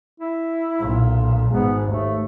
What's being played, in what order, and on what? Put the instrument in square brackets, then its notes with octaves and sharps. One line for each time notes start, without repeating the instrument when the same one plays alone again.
[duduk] E4
[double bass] B1 A#2
[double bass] G#1 G#2 [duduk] B3
[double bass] D#2 [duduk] A3